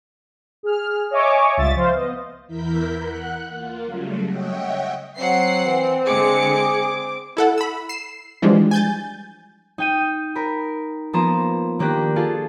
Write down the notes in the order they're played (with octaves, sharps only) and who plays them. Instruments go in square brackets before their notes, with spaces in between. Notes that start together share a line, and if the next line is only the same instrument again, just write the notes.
[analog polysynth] G#4 F6
C#5 D#5 E5 G#5 C#6 D6
C#2 G3 F4 E5 A6
F3 C5 F5
B3 D#5
[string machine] E2 E3 E4 A#4 G6 B6
F#5 F#6
A#3 F4
C#3 F#3 G3 A3
C#5 D#5 E5 F#5 G5
[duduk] F#3 [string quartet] C4 [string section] F#5 C7
[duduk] E3
[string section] D3 G#3 C#7 [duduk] G#4 [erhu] D6
[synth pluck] E4 A4 F#5
B5 E6
C7 E7
E3 F3 G3 G#3 D4
G#5 G6 A6
[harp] D#4 G5 D#7
A#4 B5
F3 A#3 B3 A#5 C6 E7
D#3 A#3 D4 G4 F#6 A#6
F4 G#4 A4